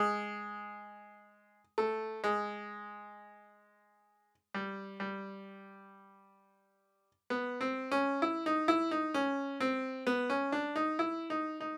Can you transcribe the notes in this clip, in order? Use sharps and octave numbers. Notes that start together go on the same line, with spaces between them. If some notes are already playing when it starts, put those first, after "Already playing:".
Already playing: G#3
A3
G#3
G3
G3
B3
C4
C#4
E4
D#4
E4
D#4
C#4
C4
B3
C#4
D4
D#4
E4
D#4
D#4